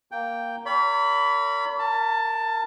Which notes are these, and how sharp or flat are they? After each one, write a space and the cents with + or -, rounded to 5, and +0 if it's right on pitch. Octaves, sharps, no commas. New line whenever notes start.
A#3 +0 G5 +0
A#4 -30 D5 -45 B5 +5
A#4 -15 A5 +15